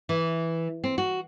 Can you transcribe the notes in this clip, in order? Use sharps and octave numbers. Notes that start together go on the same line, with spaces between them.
E3
C4
F#4